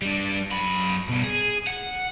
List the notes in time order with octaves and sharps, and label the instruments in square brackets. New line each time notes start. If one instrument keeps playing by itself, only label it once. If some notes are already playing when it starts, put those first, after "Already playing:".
[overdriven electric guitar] G3 D4
F#2 B5
B2 G3
G#4
F#5